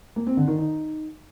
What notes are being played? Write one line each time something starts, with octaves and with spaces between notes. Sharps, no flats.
A#3
C4
D3
D#3
D#4